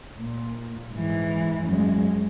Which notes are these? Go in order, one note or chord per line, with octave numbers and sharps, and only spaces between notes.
A#2
G#2 E3
F#2 G#3